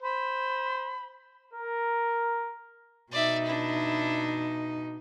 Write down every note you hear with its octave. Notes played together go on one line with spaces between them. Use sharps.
C5 B5
A#4
B2 D#4 D5 E5
D4 E4